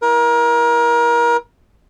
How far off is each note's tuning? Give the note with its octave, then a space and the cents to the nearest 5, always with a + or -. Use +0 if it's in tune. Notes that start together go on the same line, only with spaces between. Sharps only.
E4 +0 A#4 +30